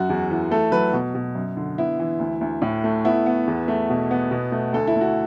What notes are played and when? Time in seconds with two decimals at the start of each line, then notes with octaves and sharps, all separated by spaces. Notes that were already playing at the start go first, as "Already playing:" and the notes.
Already playing: F#2 F#4
0.09 E2
0.30 E3
0.51 A3 A4
0.71 F#3 B4
0.93 B2
1.14 B2
1.35 F#2
1.57 D3
1.78 B3 E4
1.99 E3
2.20 D2
2.41 D2
2.62 A2
2.84 A3
3.05 B3 E4
3.26 B3
3.47 E2
3.68 A3
3.90 B2
4.11 B3
4.31 B2
4.52 A3
4.73 D2 A4
4.87 E4
4.95 D2
5.01 F#4